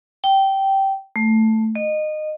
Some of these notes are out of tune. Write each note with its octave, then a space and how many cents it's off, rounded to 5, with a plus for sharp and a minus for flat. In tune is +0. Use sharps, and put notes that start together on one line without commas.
G5 -15
A3 +5
D#5 -20